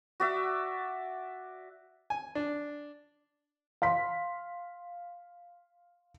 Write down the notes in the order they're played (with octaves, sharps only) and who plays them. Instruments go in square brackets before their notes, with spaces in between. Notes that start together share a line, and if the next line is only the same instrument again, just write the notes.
[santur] F#4 D5 E5
[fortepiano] G#5
D4
[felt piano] F5 C6 B6